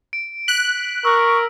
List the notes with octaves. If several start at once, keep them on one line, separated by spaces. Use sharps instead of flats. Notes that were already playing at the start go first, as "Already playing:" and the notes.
D7
F#6 B6
A#4 C#6 E6